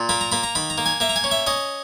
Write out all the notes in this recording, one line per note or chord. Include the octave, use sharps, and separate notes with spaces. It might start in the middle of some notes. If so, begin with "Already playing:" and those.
Already playing: A#2
A#3 B5
A#5
A#3 B5
A#5
D#3 B5
A#5
A#3
G#5
A#3 E5
A#5
G#5
C#4
E5
C#4 D#5